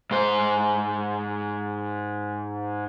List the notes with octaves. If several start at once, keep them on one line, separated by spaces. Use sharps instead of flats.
G#2 C5